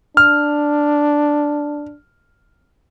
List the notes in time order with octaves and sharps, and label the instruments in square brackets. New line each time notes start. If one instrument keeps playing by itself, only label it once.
[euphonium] D4 [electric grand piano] F6